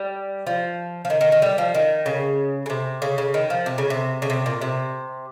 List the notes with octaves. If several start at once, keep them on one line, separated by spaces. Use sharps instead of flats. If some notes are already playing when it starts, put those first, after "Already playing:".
Already playing: G3
F3
F3
D#3
D#3
D#3
G3
F3
D#3
C#3
C#3
C3
C#3
C#3
D#3
F3
C3
C#3
C3
C#3
C3
A#2
C3